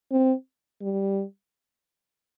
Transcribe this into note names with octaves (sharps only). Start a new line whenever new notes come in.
C4
G3